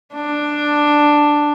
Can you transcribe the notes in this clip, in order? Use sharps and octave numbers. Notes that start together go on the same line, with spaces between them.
D4